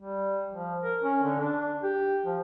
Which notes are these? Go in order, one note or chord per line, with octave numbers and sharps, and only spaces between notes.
G3
F3
A#4
C#4
D3
D4
G4
F3